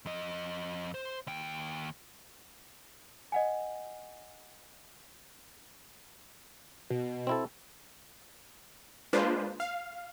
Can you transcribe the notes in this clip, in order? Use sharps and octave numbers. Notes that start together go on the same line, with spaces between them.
F2 D#5
C5
D#2 G5
D#5 F#5 G#5
B2
C4 E4 A4
G#3 A#3 D4 F4 B4 C5
F5